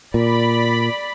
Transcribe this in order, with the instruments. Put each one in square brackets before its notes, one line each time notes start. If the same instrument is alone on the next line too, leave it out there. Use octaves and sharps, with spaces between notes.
[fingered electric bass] A#2 [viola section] D5 B5